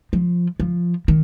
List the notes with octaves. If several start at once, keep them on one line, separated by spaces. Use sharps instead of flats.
F3
F3
D#3